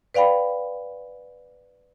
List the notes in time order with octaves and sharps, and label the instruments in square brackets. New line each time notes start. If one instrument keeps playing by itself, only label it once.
[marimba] B4 D5 F5 G5 B5